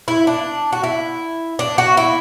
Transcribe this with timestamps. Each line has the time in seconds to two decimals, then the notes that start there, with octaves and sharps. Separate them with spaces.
0.08 E4
0.27 D4
0.73 F#4
0.83 E4
1.59 D4
1.78 F#4
1.97 E4